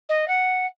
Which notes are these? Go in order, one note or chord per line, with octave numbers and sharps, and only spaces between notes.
D#5
F#5